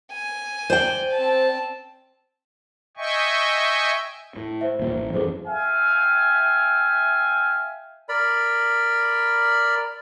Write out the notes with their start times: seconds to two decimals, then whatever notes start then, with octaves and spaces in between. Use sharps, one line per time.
0.13 G#5
0.70 C5 D5 G5
1.13 C4 A5
2.97 D#5 E5 G5 G#5 C#6
4.36 A2
4.61 C5 E5
4.79 D#2 A#2
4.94 A1
5.13 F#2 E3 G#4 A4 C5
5.47 E5 F5 G5 G#5
8.09 A#4 D5 B5